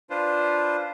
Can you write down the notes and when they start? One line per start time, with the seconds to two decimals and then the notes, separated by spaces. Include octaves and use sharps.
0.10 D4 F4 B4 C5